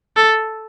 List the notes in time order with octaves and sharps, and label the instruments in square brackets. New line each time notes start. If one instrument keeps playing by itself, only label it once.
[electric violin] A4